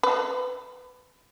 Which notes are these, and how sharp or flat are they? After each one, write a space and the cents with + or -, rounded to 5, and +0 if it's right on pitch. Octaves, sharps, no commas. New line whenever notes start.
B4 +20